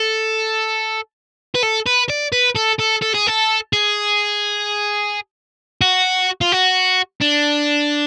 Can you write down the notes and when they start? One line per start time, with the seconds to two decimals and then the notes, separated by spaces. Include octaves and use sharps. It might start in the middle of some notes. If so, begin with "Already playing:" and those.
Already playing: A4
1.55 B4
1.63 A4
1.86 B4
2.09 D5
2.33 B4
2.56 A4
2.80 A4
3.02 A4
3.14 G#4
3.27 A4
3.73 G#4
5.81 F#4
6.41 F4
6.52 F#4
7.21 D4